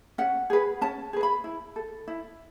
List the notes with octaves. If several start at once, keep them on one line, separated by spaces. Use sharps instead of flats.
C#4 F#5
G#4 B4
C#4 A5
G#4 B4
B5
E4
A4
E4